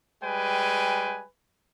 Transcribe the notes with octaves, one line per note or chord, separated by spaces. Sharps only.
G3 G#3 B4 G5 G#5